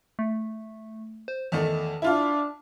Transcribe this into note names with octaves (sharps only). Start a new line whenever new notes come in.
A3
C5
E2 D#3 A3 A5
D4 E4 F4 F5